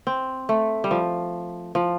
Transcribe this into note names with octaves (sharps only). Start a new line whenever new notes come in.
C4
A3
G3
F3
F3